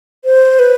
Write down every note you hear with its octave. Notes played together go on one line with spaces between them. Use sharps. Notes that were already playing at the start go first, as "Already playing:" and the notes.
C5
B4